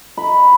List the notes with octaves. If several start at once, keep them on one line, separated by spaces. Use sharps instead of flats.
B5